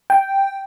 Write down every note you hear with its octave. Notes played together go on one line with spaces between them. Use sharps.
G5